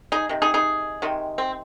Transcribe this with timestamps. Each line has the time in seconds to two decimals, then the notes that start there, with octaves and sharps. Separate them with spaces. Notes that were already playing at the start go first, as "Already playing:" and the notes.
0.12 D#4 G#4
0.29 C3 D#3
0.42 D#4 G#4
0.54 D#4 G#4
1.02 C3 D#3 G#3
1.38 C4